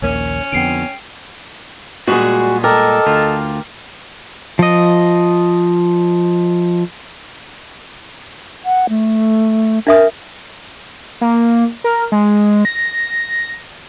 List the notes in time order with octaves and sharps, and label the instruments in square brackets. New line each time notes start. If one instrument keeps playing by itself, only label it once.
[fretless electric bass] A#1 D#2 A#3 [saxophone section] C#4 [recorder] C#5
[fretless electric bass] F2 D3 [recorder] B3 [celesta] G5 C7 D7
[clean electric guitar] A#2 G3 G#3 [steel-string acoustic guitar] F#4 G#4
[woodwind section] A4 D#5 A5 [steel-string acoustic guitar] A#4 [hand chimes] G5 D6 F6
[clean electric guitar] D2 F4
[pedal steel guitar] F3 D#5
[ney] F#5
A3
[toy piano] D4 E5 D#6 [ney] A#4
[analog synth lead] A#3
A#4
G#3
A#6